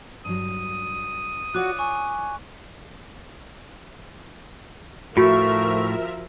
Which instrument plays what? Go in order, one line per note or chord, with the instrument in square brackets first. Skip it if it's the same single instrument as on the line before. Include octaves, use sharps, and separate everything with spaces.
[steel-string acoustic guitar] G2 F#3 [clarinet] D#6
[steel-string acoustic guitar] F4 C#5 D5 [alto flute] F#4 [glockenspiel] D6 F#6
[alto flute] G#5 [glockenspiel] C#6
[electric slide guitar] A2 A3 [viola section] F3 A#4 E5 [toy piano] F4 F#4 [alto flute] C#6